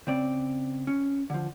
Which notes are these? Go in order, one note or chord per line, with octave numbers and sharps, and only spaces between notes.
C#3 C4 D5
C#4
D3 F3